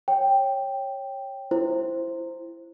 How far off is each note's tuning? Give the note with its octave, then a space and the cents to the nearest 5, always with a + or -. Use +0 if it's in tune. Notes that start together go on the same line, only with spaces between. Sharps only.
C#5 -15 G5 +0
E4 +20 C5 +0